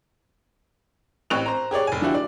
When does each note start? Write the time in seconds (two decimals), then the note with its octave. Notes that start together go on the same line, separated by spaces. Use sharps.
1.30 A1 C4 G4 C#6 F#6 F7
1.46 C5 A#5
1.71 G4 G#4 C#5 D5
1.87 F1 G#5
2.01 D3 F3 E4 F#4 G4
2.14 D5